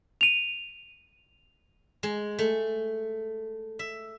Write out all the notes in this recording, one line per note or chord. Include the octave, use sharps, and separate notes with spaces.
D#7 F7
G#3
A3
E5